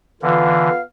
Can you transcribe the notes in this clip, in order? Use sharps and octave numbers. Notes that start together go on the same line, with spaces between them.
D3 E3 B3 F4 F5